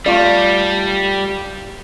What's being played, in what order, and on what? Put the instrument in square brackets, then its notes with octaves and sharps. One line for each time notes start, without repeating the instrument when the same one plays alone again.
[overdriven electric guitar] G3 [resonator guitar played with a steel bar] A3 F4 D5